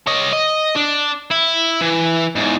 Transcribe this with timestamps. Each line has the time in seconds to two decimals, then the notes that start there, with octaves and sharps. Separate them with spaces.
0.07 C#5 D#5
0.33 D#5
0.76 D4
1.31 E4
1.81 E3
2.36 E2 G#2